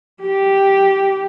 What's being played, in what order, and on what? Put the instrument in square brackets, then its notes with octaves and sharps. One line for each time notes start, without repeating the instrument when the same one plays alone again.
[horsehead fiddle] G4